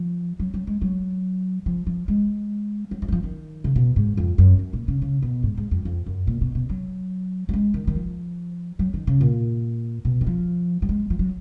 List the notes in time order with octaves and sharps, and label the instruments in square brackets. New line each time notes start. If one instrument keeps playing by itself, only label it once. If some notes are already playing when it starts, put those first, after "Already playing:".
Already playing: [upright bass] F3
F#3
F#3
G#3
F#3
F3
F3
G#3
F#3
F3
F#3
F3
D#3
C#3
B2
G#2
F2
F#2
F#2
A#2
C#3
C#3
B2
G#2
G#2
F2
F2
F#2
A#2
B2
B2
F#3
F#3
G#3
D#3
D#3
F3
F#3
D#3
C#3
A#2
B2
D#3
F3
F#3
G#3
F3
F#3